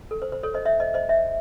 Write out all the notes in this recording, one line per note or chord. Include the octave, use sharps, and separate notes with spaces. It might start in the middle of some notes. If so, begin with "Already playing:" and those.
A4
C5
C5
A4 C#5
C5 D#5
C#5 E5
C5 D#5
C5 D#5
C#5 E5